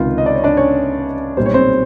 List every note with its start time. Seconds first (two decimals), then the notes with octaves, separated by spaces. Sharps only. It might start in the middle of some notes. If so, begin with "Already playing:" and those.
Already playing: C#2 C3 D#3 F4
0.18 D#5
0.26 D5
0.35 C#5
0.44 D4 D5
0.57 C#4 C#5
1.37 B1 A#2 G3 C5
1.46 C#5
1.54 C4 C5